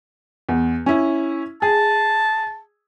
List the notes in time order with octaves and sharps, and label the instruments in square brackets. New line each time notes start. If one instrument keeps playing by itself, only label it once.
[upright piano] E2
C#4 E4
[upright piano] G#4 [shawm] A5